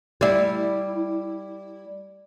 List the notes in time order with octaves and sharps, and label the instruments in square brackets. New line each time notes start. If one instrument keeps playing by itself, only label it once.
[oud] G3 E4